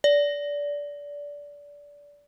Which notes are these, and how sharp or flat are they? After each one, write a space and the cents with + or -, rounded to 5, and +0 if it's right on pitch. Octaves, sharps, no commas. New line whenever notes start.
D5 -20